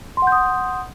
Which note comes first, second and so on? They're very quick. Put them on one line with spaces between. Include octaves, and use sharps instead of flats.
C6 F#5 G6 D#6